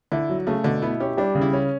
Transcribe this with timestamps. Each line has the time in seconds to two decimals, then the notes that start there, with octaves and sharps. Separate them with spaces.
0.12 D3 E4
0.29 F#3
0.47 C#3 A3
0.64 B2 D3
0.82 B3 E4
1.00 C#4 G4
1.17 G3 D4
1.35 C#3
1.41 E4
1.53 C#4